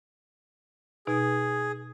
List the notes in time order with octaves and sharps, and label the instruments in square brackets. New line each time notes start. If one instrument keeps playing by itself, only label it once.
[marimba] B2 D#4 [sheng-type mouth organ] G#4